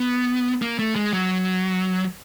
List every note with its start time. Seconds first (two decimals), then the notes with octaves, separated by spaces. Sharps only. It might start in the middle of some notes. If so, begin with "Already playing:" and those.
Already playing: B3
0.62 A#3
0.79 A3
0.96 G#3
1.13 F#3